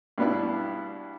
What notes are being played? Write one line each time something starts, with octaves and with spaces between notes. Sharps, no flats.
G2 B2 B3 D4 E4